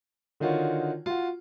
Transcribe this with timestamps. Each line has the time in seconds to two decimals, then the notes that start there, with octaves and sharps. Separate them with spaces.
0.40 D3 D#3 D#4 F4 F#4 C#5
1.06 F4 F#4